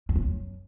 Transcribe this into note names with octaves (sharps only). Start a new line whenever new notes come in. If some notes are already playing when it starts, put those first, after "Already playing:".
F#2
E2
F#2